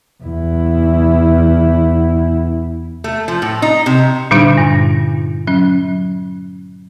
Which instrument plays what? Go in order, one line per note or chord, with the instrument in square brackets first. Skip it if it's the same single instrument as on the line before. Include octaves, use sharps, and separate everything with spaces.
[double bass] E2 E4
[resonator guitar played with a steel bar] A3
F3
A2
D#4
C3
[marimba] A#2 D3 G3 D4 D#4
G2
F#3 C#4